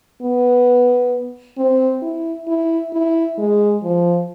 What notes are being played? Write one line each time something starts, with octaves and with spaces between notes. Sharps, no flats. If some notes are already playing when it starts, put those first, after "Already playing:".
B3
C4
E4
E4
E4
G#3
F3